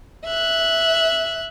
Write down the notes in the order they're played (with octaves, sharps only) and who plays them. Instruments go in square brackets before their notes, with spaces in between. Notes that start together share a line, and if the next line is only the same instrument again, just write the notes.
[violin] E5 F#6